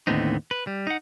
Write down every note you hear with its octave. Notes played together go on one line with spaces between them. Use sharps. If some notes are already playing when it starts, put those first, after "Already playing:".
D#2 A2 D3 B3 C4 D#4
B4
G3
D#4 F#5